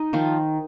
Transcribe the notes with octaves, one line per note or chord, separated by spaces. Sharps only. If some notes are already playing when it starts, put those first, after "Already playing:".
Already playing: D#4 D#5
D#3 F3 F4